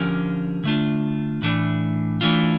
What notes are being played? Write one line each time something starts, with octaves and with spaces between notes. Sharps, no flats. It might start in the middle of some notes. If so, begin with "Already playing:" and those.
Already playing: D3 F3 C#4 G4 A#4
D3 A3 D4 F4
A2 E3 A3 D4
E3 A3 D4 F4